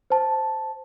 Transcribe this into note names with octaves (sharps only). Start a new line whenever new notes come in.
C5 A5